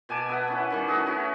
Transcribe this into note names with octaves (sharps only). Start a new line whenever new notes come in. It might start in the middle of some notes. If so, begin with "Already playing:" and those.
B2 G#5 A5 D6
B3 B4 E5 F#5
B3 C#4 E4
D#3 G3 C#4
A3 E4 F#4 G#4
C#4 E4 F#4